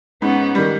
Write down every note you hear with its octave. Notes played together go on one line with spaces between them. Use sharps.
G#2 B3 C#4
D#3 G3